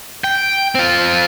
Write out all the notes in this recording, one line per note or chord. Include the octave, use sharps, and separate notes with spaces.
G5
C4 F4